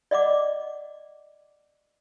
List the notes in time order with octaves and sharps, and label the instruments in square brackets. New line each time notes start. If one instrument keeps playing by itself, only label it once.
[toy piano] D5 D#5 F#5 D6